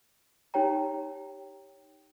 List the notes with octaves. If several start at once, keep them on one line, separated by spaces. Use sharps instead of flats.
D#4 G4 C#5 G5 A#5